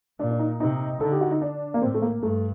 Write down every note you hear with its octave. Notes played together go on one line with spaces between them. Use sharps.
A#2 D4
D4
D#4
C3 D#4
D3 A4
G4
F#4
D#4
D4
A#3
A2 C4
A3
A#3
G2 A3